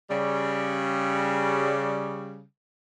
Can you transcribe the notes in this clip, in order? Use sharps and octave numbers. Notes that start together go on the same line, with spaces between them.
C#3 G3